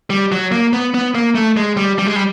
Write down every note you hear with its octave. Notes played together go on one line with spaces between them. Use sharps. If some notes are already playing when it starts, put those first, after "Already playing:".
G3
F#3
A#3
B3
B3
A#3
A3
G#3
G3
G3
G#3
G3